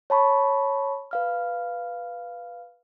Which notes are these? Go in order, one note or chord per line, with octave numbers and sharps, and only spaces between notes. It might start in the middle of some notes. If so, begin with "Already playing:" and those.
C#5 A5 B5 C#6
B4 F5 F6